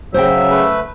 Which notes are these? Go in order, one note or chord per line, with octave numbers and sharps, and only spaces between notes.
C#3 F#3 C5 E5 G5
A3 B4